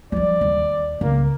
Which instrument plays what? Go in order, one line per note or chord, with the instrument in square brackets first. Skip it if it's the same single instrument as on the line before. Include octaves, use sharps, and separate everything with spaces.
[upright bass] F3 G3 [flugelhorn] D5
[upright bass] D#2
[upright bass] C#2 [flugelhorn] A#3